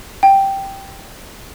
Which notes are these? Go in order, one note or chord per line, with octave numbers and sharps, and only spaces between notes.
G5